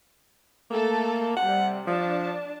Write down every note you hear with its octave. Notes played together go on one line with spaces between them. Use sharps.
A3 A#3 A4
C3 G3 F#5
F3 D4 A5